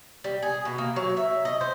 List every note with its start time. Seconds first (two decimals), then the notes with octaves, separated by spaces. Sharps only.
0.24 G3
0.43 G#4
0.65 B2
0.78 A#3
0.96 F#3
1.17 E5
1.45 D#5
1.61 C5